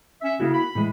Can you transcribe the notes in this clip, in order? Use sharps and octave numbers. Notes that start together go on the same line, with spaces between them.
C#4 E5
C#3 A#3 E4 F#4
B5
A2 E3 G#3